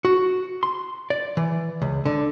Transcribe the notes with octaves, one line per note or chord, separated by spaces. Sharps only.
F#4
C6
D5
E3
C#2
D3